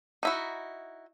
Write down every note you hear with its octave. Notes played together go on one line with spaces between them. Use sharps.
D#4 E4 F#4